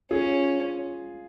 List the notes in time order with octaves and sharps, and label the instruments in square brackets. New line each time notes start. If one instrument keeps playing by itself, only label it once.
[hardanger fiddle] C#4 [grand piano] F4 G#4